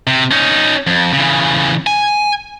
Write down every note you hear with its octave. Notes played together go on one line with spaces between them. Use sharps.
C3
C#4 D#4
F2
C#3 E3
G#5